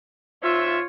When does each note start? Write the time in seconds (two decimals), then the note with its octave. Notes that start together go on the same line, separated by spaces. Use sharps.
0.43 G#2 F4 C5 C#5 E5